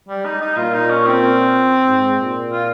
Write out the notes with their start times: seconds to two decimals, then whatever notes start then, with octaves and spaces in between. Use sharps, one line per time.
0.08 G3
0.25 D#4
0.41 D#4
0.57 A#2 F4
0.74 D#4
0.90 C#4
1.06 C4
1.87 G#2
2.19 A#2
2.52 F4